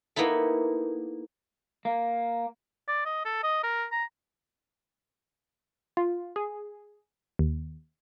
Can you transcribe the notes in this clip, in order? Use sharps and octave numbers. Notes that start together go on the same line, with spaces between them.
A#3 B3 D#4 E4 A4
A#3
D5
D#5
A4
D#5
A#4
A#5
F4
G#4
D#2